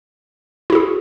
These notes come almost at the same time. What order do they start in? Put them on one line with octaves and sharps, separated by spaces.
E4 F#4 G#4